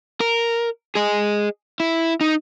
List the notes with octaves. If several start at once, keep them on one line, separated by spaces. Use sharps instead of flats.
A#4
G#4 D#5
E4
D#4